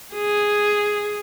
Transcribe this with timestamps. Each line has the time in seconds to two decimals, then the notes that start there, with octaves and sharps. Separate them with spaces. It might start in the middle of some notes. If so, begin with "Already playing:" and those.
0.14 G#4